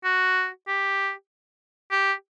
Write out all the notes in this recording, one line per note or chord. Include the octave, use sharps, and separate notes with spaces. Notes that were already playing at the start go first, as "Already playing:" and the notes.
F#4
G4
G4